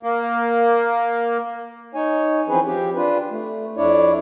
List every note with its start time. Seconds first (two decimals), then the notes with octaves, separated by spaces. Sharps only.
0.03 A#3
1.95 D#4 C#5 G#5
2.48 E3 F3 C4 C#4 G#4 B4
2.65 F3 C4 G4
2.95 D4 F4 B4
3.31 A3
3.77 F2 D4 E4 C#5 D5